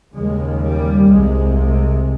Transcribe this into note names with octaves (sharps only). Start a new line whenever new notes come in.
D#2 C#3 G#3
G3
C2 C3 G#3
G#3